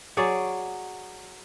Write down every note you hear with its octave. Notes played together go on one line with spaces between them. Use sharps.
F#3 G#4 C#5 D5